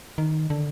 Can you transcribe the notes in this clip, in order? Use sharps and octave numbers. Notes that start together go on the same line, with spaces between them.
D#3
D3